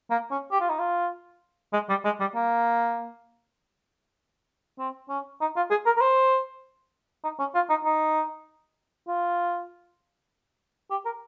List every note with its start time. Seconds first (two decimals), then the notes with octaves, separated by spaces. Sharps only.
0.10 A#3
0.31 C#4
0.51 G4
0.60 F4
0.69 D#4
0.79 F4
1.73 G#3
1.89 G3
2.05 G#3
2.20 G3
2.35 A#3
4.79 C4
5.09 C#4
5.41 D#4
5.56 F4
5.70 G#4
5.86 A#4
5.97 A#4
6.01 C5
7.24 D#4
7.39 C#4
7.55 F4
7.69 D#4
7.84 D#4
9.08 F4
10.90 G4
11.05 A#4